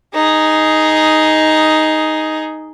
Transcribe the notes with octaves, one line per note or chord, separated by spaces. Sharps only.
D#4 G#4